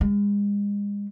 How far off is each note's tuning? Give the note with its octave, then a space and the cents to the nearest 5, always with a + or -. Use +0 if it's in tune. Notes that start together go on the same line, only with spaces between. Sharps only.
G#3 -35